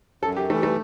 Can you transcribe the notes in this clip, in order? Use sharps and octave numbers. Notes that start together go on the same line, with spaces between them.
F#2 A4
G4
E3 G3 A3
A3